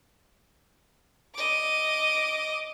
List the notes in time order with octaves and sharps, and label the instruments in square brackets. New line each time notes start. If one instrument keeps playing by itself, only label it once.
[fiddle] D#5 D6